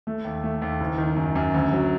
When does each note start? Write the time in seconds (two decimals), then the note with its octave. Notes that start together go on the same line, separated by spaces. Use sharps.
0.07 A3
0.24 D#2
0.43 A3
0.62 D#2
0.80 F#1
0.98 D#3
1.16 F#2
1.35 F#2
1.54 D2
1.73 F#3